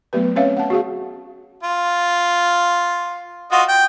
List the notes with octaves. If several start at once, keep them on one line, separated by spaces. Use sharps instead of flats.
F#3 A3 B3 G4 B4
C4 C#4 B4 C#5 E5 F5
F#5 A5
F#4 G#4 F5
F4
F4 F#4 D#5
G5